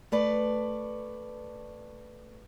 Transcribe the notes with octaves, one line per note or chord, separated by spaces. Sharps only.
A3 B4 D5